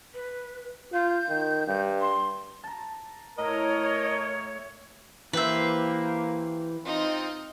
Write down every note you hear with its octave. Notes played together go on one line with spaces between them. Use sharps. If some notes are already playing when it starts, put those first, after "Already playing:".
B4
F4 G6
D#3
G2
C6
A5 A#5
A2 A#4 C#5 D#5
E3 A#3 G4 B4 C5 E5
C4 D#4 F4